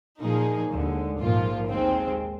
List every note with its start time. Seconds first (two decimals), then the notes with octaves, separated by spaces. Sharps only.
0.21 A#2 F3 A#3 D#4 G#4
0.71 D#2 D3 G#3
1.20 A#1 G#2 F3 A#3 F4
1.69 D#2 D#3 G#3 C4